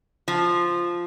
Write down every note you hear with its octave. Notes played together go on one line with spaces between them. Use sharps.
F3